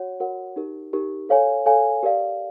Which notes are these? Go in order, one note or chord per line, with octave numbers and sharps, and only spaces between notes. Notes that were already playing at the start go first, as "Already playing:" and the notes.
Already playing: F#4 C#5 F#5
F#4 A#4 C#5 F#5
D#4 G4 A#4
D#4 G4 A#4
A4 C#5 F5 G#5
A4 C#5 F5 G#5
G4 A#4 D5 F5